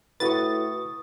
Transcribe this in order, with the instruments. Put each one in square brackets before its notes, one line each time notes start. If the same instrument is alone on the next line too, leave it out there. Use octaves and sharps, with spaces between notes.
[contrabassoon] A2 [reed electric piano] F#4 B4 [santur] C#6 D#6 E6 [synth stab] A6